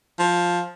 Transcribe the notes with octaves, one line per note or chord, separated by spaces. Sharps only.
F3